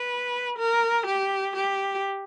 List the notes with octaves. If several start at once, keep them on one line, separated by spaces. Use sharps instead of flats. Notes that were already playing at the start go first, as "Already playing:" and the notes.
Already playing: B4
A#4
G4
G4